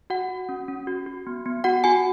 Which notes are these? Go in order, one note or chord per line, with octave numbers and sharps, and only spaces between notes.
F#4 F#5
F#4
C#4
C#4
F#4
F#4
B3
B3
F#4 F#5
F#4 G#5